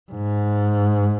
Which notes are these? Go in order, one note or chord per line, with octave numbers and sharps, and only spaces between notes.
G#2